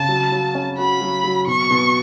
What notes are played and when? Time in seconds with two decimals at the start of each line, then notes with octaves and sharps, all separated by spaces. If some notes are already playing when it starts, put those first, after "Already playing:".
Already playing: C#3 A5
0.09 F#3
0.32 F#3
0.55 C#4
0.78 F#4 B5
1.01 F#3
1.24 F#3
1.47 B2 C#6
1.71 B2